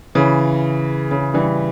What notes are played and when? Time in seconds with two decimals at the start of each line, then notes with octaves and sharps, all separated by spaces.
0.15 C#3 E3
1.11 C#3
1.34 E3 G3